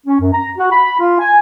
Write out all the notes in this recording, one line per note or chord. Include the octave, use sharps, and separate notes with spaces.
C#4
F#2
A#5
F#4
B5
F4
G#5